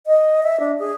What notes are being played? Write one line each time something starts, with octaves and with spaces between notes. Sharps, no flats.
D#5
E5
D4
G#4